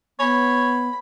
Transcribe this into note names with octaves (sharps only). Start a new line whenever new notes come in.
B3 C#5 B5